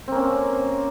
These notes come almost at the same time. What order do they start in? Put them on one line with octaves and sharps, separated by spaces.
C4 A#3 C#4